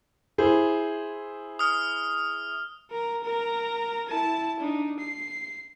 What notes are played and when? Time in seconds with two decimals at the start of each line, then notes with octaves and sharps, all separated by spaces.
0.38 E4 G#4 C5
1.59 D#6 F6
2.91 A#4 A#5
3.24 A#4 A#5
4.08 E4 A5
4.60 D4 D#4
5.00 C7